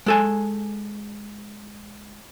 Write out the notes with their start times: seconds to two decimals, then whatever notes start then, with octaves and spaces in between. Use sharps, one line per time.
0.06 G#3 A4 G#5